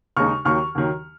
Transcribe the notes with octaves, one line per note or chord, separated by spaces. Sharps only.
D#2 C#3 G#3 D#4 C#6 F6
D#2 D#3 F#3 C#6 F6
D#2 D#3 F#3